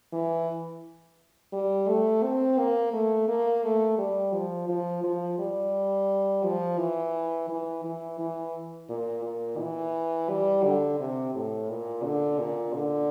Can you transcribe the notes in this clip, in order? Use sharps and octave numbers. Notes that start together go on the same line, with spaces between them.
E3
G3
A3
C4
A#3
A3
A#3
A3
G3
F3
F3
F3
G3
F3
E3
E3
E3
E3
A#2
A#2
E3
G3
D3
C3
A2
A#2
D3
A#2
D3